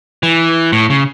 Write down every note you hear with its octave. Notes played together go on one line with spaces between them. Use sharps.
E3
A2
C#3